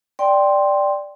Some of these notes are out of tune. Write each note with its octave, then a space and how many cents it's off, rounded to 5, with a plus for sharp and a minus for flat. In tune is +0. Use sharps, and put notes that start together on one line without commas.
D5 +0 G5 +0 C6 +0